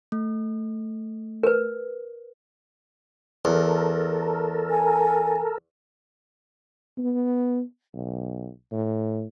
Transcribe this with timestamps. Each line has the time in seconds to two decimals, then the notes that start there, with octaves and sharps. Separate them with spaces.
0.12 A3
1.43 A#4 B4
3.45 E2 A4 A#4
4.71 G#5
6.98 B3
7.94 B1
8.72 A2